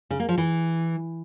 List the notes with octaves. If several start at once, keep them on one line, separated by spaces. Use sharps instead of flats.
C#3
A#3
F3
E3